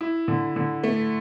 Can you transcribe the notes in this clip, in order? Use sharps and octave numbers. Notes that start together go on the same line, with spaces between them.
E4
D3
D3
A3